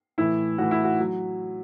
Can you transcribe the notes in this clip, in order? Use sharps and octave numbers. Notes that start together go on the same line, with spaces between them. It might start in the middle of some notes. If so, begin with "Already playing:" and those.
A2 E3 E4
A2 E3 F#4
E4
F#4
F#3